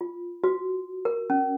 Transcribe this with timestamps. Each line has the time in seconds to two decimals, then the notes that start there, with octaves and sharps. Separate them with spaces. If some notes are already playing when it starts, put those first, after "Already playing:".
0.01 F4
0.44 F#4
1.05 A#4
1.30 C#4